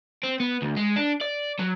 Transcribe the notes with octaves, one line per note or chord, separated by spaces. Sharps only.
C4
B3
D2
G#3
D4
D5
F#3